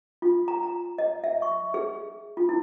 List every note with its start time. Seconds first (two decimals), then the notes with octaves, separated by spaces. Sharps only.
0.22 F4
0.48 A#5
0.63 A#5
0.98 D#5
1.24 E5
1.42 C#6
1.74 G#4
2.37 F4
2.49 E4